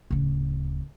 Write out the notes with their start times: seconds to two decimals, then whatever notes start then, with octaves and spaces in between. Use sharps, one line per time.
0.11 D1 C#3